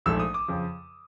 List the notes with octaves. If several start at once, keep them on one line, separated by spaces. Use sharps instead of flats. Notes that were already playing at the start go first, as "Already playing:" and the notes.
A#1 G#2 F3 A3 E6
D#6
D6
F2 C#3 F3